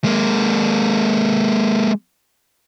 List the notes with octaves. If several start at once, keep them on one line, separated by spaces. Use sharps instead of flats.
G#3 A#3